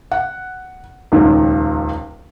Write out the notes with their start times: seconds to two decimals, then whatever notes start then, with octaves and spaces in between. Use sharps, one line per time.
0.12 F#5
1.12 D#1 C#2 D#3 F#3